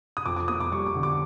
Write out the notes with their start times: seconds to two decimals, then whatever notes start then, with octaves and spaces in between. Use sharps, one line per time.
0.17 D#6
0.26 F2 D6
0.36 D6
0.48 A#3 D#6
0.60 D6
0.72 G3 C#6
0.87 D6
0.95 D3
1.03 D6